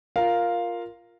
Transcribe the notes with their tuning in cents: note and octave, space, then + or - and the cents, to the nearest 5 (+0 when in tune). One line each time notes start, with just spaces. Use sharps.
F4 +0 A#4 +0 F5 +0